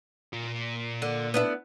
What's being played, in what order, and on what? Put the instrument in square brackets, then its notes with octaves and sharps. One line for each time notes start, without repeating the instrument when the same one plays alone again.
[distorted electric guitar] A#2
[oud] D3
B3 D4 E4